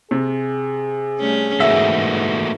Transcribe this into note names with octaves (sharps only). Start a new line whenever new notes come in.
C3 G#4
G3 A3 C#4
G#2 E3 A3 A#3 F#4 E5